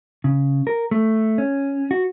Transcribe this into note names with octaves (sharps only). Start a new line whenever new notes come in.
C#3
A#4
A3
C#4
F#4